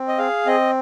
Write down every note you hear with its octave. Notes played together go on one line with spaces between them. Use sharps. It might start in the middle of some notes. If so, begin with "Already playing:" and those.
Already playing: C4
D#5
G#4 F5
C4 D#5